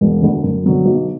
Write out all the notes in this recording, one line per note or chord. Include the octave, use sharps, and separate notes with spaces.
E1
D2 D3
F#2
D3 F#3 B3
B1